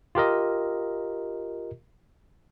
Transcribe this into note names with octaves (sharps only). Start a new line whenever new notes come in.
F4 G4 A#4 D#5